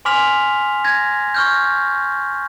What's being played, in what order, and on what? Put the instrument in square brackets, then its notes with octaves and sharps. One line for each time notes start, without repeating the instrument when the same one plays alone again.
[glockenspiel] G#5 C6 D6 F6 B6 F7
G#6 A#6
C#6 F6 G6